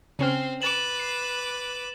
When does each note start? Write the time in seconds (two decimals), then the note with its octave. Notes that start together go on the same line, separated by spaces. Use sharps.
0.19 C#3 C4 C#4 F6
0.62 B4 D6 A6 E7 F#7
1.00 C7